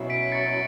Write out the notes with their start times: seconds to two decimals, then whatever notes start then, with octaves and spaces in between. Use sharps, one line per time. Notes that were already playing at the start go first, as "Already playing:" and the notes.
Already playing: B2 F#3 C#4 E4
0.10 B6 D7
0.32 A6 C#7